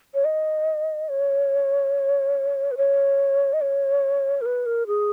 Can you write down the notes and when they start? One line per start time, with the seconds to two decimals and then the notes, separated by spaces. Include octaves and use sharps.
0.14 C#5
0.25 D#5
1.09 C#5
2.71 B4
2.77 C#5
3.53 D#5
3.61 C#5
4.41 A#4
4.46 B4
4.66 A#4
4.87 G#4